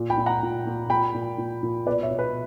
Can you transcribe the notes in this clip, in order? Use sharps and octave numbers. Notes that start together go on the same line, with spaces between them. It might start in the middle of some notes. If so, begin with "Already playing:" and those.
Already playing: A#2
G5 B5
A#2
F#5 A#5
A#2
A#2
A#2 G5 B5
A#2
A#2
A#2
B2 B4 D5
C#5 E5
B2
B4